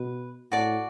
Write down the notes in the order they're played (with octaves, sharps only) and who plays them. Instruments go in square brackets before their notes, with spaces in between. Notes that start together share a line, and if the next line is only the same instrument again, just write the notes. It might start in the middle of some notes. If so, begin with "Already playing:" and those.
Already playing: [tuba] B2 [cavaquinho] B4
[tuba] A2 [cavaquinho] F#4 D5 A5